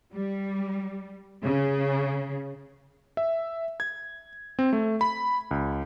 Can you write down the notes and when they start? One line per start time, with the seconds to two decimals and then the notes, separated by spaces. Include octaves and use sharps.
0.12 G3
1.43 C#3
3.17 E5
3.80 G#6
4.59 C4
4.73 A3
5.01 B5
5.51 C#2